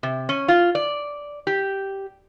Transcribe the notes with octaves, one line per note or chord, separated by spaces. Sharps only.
C3
C#4
F4
D5
G4